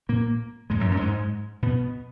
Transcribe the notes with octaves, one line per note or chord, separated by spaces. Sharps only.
A#2 A#3
G#2 G#3
F#2 F#3
F#2 F#3
G#2 G#3
B2 B3